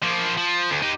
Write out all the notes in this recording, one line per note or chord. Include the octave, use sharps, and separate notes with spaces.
F3 A#3
F3
D2
D#4 G4